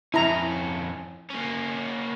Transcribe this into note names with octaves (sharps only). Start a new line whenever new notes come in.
F2 C#4 E4 A#5
A#3 C#4